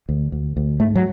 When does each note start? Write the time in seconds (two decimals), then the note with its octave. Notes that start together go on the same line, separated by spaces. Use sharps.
0.09 D2
0.32 D2
0.57 D2
0.79 G#2 A3
0.95 F#3